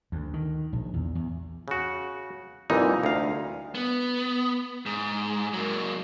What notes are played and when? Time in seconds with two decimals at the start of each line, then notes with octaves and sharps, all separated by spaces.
0.12 D2
0.34 D#3
0.73 A#1
0.94 E2
1.15 E2
1.68 C#3 F#4
2.70 C2 F2 A#2 E3 D#4
3.03 D2 F5
3.75 B3
4.86 G#2
5.54 F#3 A#3